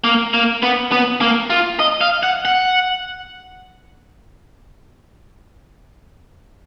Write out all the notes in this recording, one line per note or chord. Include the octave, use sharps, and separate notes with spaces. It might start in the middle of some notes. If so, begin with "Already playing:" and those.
A#3
A#3
B3
B3
A#3
F4
D#5
F5
F#5
F#5